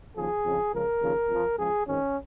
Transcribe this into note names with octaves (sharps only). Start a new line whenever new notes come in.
D#2 C#3 F3 G#4
F2 C#3 F3
C#2 C#3 F3 A#4
D#2 C#3 F3
F2 F3
C#2 C#3 F3 G#4
G#1 G#2 D#3 C#4